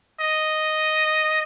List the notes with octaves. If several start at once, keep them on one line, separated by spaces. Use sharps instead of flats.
D#5